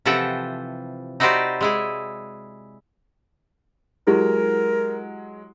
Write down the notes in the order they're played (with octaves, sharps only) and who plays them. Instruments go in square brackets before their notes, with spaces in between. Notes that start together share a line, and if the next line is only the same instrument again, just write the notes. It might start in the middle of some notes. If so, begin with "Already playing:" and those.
[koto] C3 E3 F3 A4 F#5 G5
D#4 E4 F#4 G4 C5 D5
G#3 E4 G#4
[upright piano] F#3 G#3 [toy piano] E4 G4 [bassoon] A#4